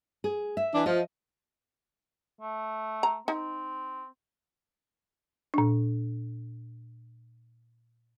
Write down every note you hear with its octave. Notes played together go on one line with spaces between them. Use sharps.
G#4
E5
E3 D4
F3 D#5
A3
A#5
C4 D#4
A#2 D4